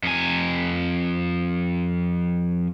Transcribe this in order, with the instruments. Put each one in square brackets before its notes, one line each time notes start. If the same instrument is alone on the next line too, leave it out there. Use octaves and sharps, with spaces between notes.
[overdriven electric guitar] F2 G#5